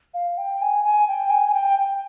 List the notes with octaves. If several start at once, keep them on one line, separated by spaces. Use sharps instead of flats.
F5
G5
G#5
G#5
G5
G#5
G#5
G5